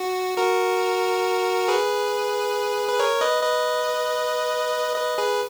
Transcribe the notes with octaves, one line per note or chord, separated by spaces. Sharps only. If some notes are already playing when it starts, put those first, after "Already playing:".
Already playing: F#4
F#4 A#4
G#4 B4
B4
A#4 C#5
B4 D#5
B4 D#5
B4 D#5
G#4 B4